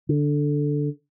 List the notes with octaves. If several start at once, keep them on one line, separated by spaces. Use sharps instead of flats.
D3